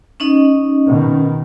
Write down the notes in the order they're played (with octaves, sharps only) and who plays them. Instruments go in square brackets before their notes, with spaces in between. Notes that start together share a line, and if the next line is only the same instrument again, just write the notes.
[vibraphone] C#4 D#4 D#5
[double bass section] B2 D#3